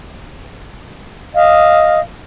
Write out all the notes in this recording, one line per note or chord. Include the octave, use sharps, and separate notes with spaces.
D#5 F5